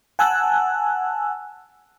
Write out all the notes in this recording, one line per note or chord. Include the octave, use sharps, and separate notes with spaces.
F#5 G#5 A5 E6 F#6